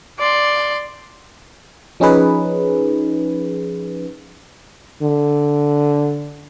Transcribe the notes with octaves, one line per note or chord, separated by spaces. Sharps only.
D5 C6
F3 C#4 D#4 G#4 B4
D3